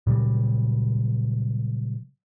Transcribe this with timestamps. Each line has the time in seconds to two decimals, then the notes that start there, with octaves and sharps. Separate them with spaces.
0.07 A#2 C#3 F#3 G3